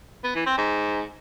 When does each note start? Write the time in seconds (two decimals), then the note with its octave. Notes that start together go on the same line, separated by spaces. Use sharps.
0.24 B3
0.35 E3
0.46 C4
0.58 G#2